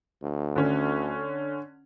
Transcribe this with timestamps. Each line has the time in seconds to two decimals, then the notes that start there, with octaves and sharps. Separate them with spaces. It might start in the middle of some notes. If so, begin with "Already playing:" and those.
0.22 D2
0.56 D3 C#4 C#5